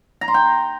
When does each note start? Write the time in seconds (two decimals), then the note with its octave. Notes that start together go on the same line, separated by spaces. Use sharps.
0.21 A#5
0.28 C6
0.34 G5